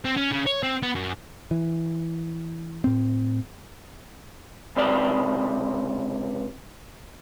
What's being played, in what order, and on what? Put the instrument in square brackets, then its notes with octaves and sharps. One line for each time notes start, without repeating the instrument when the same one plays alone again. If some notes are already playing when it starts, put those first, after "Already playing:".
[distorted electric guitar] C4
C#4
C#3
C#5
C4
B3
F#2
[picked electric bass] E3
A2 C4
[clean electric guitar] C#2 C3 D5